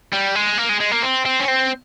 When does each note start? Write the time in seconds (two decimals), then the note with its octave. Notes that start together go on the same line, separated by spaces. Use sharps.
0.13 G3
0.35 G#3
0.58 A#3
0.69 G#3
0.80 G#3
0.91 A#3
1.02 C4
1.25 C4
1.40 C#4
1.48 C4